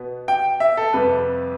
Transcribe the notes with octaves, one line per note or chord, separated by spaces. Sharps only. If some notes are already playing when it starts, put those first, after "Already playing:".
Already playing: B2 B3
G5
E5
A4
F2 C3 G3 B3 B4